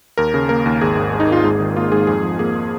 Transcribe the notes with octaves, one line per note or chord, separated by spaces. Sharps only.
D#2 A#4
C#3
A#3 A#4
D#2
G#1 G#4
G#2
G#3
D#4
G#1 F4
G#2 G#4
D#3
A#3 F4
G#2 G#4
F2 G#4
F3
A#3 G#4